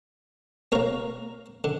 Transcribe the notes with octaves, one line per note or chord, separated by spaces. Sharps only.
B2 A#3 A#4 C#5
D3